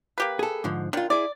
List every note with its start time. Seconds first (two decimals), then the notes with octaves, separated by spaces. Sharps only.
0.18 A#3 G4 B4
0.39 G#4 A4
0.64 G#2 D3 F3
0.93 D#3 D4 F4
1.10 E4 G#4 D5